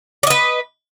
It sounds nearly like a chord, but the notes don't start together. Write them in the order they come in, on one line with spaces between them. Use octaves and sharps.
D5 D#5 B4